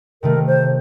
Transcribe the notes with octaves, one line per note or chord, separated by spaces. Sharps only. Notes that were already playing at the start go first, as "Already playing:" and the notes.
C3 D#3 A3 A#4
C5